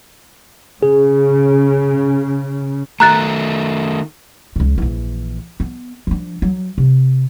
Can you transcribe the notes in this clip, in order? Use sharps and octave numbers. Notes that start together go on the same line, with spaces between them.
C#3 G#4
D#3 A3 A#5 F#6 A6
C#2 C#3
A#1 E3
B3
F3 D4
F#3
C3